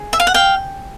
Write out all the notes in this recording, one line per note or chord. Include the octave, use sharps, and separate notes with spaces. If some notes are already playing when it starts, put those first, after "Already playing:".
Already playing: G#4
E5
F5
F#5
F5 G5